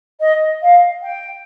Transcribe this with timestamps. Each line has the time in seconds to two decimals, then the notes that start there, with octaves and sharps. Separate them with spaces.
0.20 D#5
0.62 F5
1.02 G5